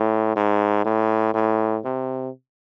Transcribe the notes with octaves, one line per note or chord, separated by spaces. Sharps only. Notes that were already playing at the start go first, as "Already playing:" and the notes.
Already playing: A2
G#2
A2
A2
C3